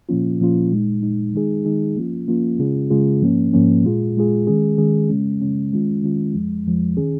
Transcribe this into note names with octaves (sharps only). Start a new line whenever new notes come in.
A#2 F3 A#3 C#4 F4
A#2 F3 A#3 C#4 F4
A#2 G#3 D#4
A#2 G#3 D#4
D#3 G#3 D#4 G#4
D#3 G#3 D#4 G#4
F3 A#3 C#4 F4
F3 A#3 C#4 F4
C#3 G#3 C#4 F4 G#4
C#3 G#3 C#4 F4 G#4
G#2 F3 A#3 C#4
G#2 F3 A#3 C#4
A#2 G#3 F4 G#4
A#2 G#3 F4 G#4
D#3 G#3 C#4 G#4
D#3 G#3 C#4 G#4
C#3 G#3 C#4
C#3 G#3 C#4
D#3 G#3 C#4 F4
D#3 G#3 C#4 F4
F2 F3 G#3
F2 F3 G#3
D#3 C#4 G#4